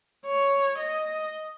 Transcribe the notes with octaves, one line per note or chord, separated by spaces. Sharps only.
C#5
D#5